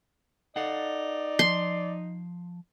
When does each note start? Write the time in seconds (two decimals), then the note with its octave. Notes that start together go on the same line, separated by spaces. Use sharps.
0.56 D#4 A4 D5 F5 F#5
1.39 F3 C6